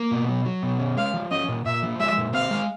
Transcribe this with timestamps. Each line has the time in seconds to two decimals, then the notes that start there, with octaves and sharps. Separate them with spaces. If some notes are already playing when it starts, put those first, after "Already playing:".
Already playing: A#3
0.12 B2
0.29 F#3
0.45 F#3
0.63 B2
0.79 C#4
0.97 G#3 F5
1.14 F3
1.31 C#4 D#5
1.49 A#2
1.66 A#2 E5
1.82 F3
2.00 G#3 E5
2.17 A#2
2.33 C4 F5
2.51 G#3